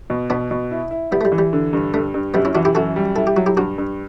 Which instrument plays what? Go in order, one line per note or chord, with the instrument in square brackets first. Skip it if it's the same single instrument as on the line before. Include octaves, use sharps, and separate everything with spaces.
[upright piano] B2
[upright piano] B2 [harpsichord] B3 D4
[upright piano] B2
E4
E4
[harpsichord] G3 B3 [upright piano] E4
[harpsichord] A3
G3
[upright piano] E3
[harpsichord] G3
[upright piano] D3
G2
[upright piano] G2 [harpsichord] A3
[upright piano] G2
[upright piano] F#2 [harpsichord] G3 B3
[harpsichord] C#4 E4
[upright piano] E3 [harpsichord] D4 F#4
[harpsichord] E4 G4
[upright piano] F#2 [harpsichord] F#4 A4
[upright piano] G3
[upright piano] E4 [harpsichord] A4
[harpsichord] G4
[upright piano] F#3 [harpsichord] F#4
[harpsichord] E4 G4
[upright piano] G2 [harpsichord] D4 F#4
[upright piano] G2